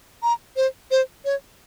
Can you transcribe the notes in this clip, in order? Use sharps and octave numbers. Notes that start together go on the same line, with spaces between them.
A#5
C5
C5
C#5